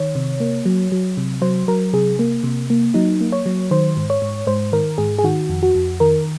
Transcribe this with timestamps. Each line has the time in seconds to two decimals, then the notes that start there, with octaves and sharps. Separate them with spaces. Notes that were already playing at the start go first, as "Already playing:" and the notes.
Already playing: D#3 C#5
0.15 C3
0.40 A#3
0.65 F#3
0.92 F#3
1.17 C3
1.42 F#3 C5
1.68 F#3 A#4
1.93 C3 G#4
2.19 A#3
2.44 C3
2.70 A#3
2.94 F#3 D#4
3.21 A#3
3.32 C#5
3.46 F#3
3.71 D#3 C5
3.97 G#2
4.10 C#5
4.22 G#2
4.47 G#2 C5
4.72 D#3 A#4
4.98 G#2 G#4
5.18 G#4
5.24 D#3 F#4
5.49 F2
5.63 F#4
5.75 F2
6.00 D#3 A#4